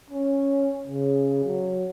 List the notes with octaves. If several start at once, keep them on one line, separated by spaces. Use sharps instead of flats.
C#4
C#3
F#3